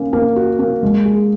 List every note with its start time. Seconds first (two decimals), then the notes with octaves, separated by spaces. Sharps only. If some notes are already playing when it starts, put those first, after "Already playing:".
Already playing: A#3 C#4
0.13 A#3
0.36 F#4
0.59 A#3
0.83 G#3
1.05 G#4